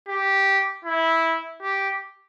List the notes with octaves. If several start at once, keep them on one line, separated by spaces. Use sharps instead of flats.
G4
E4
G4